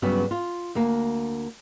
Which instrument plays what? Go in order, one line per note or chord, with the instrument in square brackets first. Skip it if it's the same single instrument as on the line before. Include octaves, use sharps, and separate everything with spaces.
[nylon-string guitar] G2 C#3 F#3 B3 C#4 F#4
F4
D2 A#3